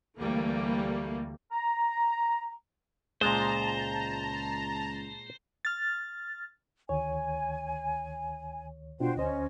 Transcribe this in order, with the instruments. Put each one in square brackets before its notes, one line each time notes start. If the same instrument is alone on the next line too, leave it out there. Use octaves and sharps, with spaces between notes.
[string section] D2 E3 G3 A3 A#3
[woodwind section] A#5
[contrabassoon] C#2 [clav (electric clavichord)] A#2 G#3 [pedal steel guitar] C5 [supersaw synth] A5 A#5
[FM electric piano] F6 A6
[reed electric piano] D2 D#3 C#5 [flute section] G#5
[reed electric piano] B2 D4 F4 [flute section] F#4 C5 G5
[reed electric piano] D2 C5 [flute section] C#4 D#5